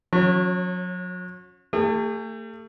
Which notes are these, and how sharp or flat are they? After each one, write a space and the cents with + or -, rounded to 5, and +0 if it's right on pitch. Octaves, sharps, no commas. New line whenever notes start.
F#3 -35 C#4 -5
A3 +35 G#4 -40